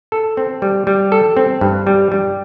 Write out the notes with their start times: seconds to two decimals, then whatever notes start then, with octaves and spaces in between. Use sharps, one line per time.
0.12 A4
0.37 C4
0.62 G3
0.87 G3
1.12 A4
1.37 C4
1.61 G2
1.87 G3
2.12 G3